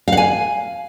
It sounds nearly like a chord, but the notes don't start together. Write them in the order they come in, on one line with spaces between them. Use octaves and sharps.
F5 F#5 G#5